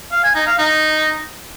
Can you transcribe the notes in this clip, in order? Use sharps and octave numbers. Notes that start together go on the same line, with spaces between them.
F5
G#5
D#4
F5
D#4